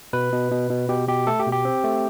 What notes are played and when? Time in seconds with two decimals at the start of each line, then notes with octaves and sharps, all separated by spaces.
0.13 B2 B4
0.32 B2
0.51 B2
0.70 B2
0.89 B2 G4
1.08 B2 G4
1.27 A3 A4
1.40 G4
1.46 B2
1.52 G4
1.65 C4
1.84 A3